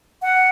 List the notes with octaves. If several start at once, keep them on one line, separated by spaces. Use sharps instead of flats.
F#5